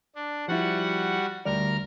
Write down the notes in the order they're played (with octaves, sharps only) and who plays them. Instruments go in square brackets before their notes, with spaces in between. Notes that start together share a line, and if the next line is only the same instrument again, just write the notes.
[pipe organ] D4
[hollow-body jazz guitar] F3 E4 [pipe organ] G3 F#4 F#5
[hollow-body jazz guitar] D2 G3 D5 [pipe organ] A#4 F6